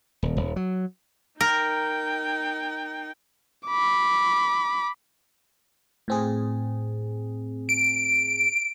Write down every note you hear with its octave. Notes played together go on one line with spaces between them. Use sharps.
D#1
D#1
F#3
D#4 A#4 G5
B5 D6
A2 C4 G#4
D7